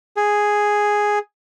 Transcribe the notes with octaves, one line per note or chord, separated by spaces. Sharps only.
G#4